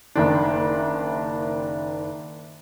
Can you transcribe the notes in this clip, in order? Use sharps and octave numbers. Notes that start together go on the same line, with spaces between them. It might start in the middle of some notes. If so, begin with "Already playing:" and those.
F#1 D#3 D4